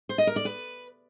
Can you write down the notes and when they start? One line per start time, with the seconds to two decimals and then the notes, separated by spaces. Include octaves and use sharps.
0.09 C5
0.18 D#5
0.27 A#4
0.36 D5
0.45 B4